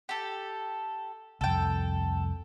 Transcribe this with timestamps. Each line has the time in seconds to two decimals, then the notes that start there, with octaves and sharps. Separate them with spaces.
0.09 G4 A4
1.41 C2 F2 A4 G5